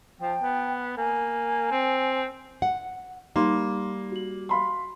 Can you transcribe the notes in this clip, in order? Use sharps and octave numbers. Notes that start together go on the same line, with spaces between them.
F3 G5 A5
B3
A#3 G#5
C4
F#5
G3 A#3 D#4 C6
F#4 F#7
F5 B5 C6